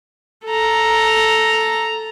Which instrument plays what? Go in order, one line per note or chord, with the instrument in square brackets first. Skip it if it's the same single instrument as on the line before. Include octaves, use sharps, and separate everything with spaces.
[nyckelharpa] A4 A#5